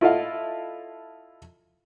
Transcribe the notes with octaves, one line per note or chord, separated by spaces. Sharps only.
E4 F4 A4 D#5 F5